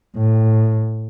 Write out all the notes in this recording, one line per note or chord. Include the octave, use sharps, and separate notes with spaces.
A2